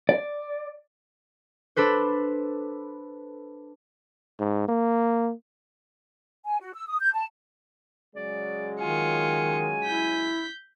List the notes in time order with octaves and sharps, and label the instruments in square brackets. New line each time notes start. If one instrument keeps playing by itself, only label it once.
[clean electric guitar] D5
[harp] D4 A4 B4 C5
[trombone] G#2
A#3
[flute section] G#5
F#4
E6
D#6
G6
A5
[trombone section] C#3 F#3 G#3 [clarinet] D5
[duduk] D#3 [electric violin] F4 C#7 [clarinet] G#5
[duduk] E4 [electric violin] G6 B6